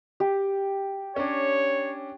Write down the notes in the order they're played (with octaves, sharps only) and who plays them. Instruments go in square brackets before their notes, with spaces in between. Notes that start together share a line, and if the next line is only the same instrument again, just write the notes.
[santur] G4
[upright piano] C#4 D4 [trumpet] C#5